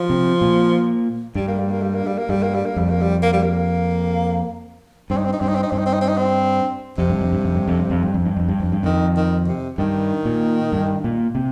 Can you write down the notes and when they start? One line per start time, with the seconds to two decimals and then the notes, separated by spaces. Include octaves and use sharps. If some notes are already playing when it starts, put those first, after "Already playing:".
Already playing: F3
0.10 C3
0.41 A#2
1.35 G2 G3
1.47 A#3
1.59 G3
1.71 A#3
1.82 G3
1.95 A#3
2.07 G3
2.18 A#3
2.29 G2 G3
2.43 A#3
2.55 G3
2.66 A#3
2.76 F2 G3
2.90 A#3
3.01 G3
3.22 A#3
3.33 G3
3.43 A#3
5.10 G2 C4
5.17 D#4
5.25 C4
5.33 D#4
5.41 G2 C4
5.48 D#4
5.55 C4
5.63 D#4
5.71 G2 C4
5.79 D#4
5.86 C4
5.93 D#4
6.01 C4
6.09 D#4
6.17 C4
6.98 F2 C3
7.10 G2
7.21 F2
7.33 G2
7.45 F2
7.55 G2
7.68 F2
7.78 G2
7.90 F2
8.03 G2
8.14 F2
8.25 G2
8.37 F2
8.49 G2
8.60 F2
8.72 G2
8.83 F2 D#3
9.16 D#3
9.48 C3
9.78 G2 D#3
10.25 A#2
10.72 G2
11.04 A#2
11.35 C3